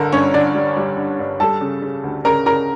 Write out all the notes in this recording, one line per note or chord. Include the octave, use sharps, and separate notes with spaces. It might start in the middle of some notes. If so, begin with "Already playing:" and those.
Already playing: G1 D3 A4 A#4
G2 C#4 C#5
D3 D4 D5
G3
G3
D3
G2
G3 A4 A5
C#3
C#3
D2
C#3 A#4 A#5
C#3 A#4 A#5